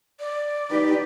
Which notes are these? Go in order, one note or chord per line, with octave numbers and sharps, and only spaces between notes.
D5
D#4 G4 B4